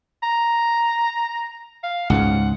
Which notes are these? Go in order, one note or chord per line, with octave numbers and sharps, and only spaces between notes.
A#5
F5
C#2 G#2 C#3 F#5